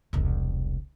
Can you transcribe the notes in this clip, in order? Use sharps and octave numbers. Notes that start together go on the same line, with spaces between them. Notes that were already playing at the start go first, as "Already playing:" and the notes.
E1 C2